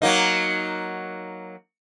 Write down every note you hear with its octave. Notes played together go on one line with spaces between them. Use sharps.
F#3 A#3 D#4